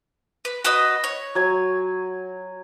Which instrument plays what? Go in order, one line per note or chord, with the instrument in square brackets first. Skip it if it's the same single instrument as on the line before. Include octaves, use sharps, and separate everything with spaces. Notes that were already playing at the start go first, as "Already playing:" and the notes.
[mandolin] B4
F#4 B4 D#5
C#5
[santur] F#3 G#5